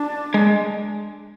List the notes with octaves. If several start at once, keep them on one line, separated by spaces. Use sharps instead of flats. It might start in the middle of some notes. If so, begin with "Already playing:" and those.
Already playing: D4
G#3